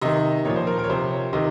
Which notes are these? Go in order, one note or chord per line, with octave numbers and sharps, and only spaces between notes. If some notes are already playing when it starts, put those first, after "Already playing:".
C3 D#3 D#5
A#2 F3 C#5
C5
A#4
A#4
C#5
C3 F3 C5
C#5
C3 D#3 D#5